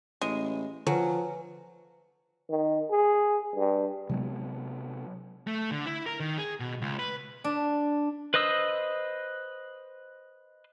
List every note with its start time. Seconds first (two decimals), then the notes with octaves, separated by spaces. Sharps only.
0.21 A1 G#3
0.87 D3 F3 F#3 B4 G#5
2.50 D#3
2.91 G#4
3.56 G2
4.09 C3 F#3 G#3 B3
5.47 A3
5.71 D3
5.86 E4
6.06 A#4
6.20 D#3
6.38 G#4
6.60 B2
6.82 C#2
6.99 B4
7.44 D4
8.34 B4 C5 D#5 D#6 E6